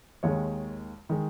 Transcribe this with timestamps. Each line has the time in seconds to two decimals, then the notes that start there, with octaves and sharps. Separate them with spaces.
0.23 D#2 D#3 G#3 C#5
1.09 D#3 G#3